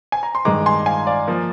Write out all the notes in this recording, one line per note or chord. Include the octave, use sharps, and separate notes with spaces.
G#5
A#5
C6
G2 D#3 G#3 A#5 D6
G#5 C6
F5 G#5
D5 F5
F3 A#3